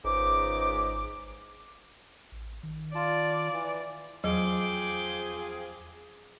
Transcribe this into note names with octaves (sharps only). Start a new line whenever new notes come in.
G#1 C#2 G#2 D6
A1
D#3
F4 D5 A5
E3
E2 F3 F#3 C4 G#4 D6 G6